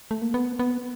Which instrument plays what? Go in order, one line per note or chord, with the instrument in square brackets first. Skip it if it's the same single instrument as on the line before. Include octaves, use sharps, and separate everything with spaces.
[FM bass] A3
A#3
B3
B3